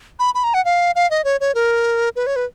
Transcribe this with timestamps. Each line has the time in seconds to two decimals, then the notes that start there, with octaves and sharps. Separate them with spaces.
0.19 B5
0.35 B5
0.44 A#5
0.54 F#5
0.65 F5
0.95 F5
1.11 D#5
1.25 C#5
1.41 C#5
1.55 A#4
2.16 B4
2.27 C#5
2.36 B4